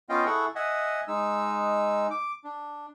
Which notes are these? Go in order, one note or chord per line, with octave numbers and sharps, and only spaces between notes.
B3 C#4 F4 D#5 F5 G5
E4 G#4 A4 F#5 C#6
D#5 E5 F#5 G#5
G#3 D#4 E6
D6
D4